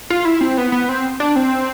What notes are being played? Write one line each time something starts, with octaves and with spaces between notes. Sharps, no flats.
F4
E4
C4
B3
B3
C4
D4
C4